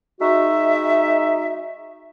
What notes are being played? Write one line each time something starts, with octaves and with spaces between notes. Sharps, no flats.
G#3 D#4 F#4 E5